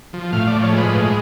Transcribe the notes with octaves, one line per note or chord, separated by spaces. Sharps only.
F3
A2 F5
F3 D5
C#5
G#3
B4
A2